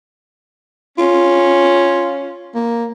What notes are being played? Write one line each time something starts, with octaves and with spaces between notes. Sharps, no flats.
C#4 F4
A#3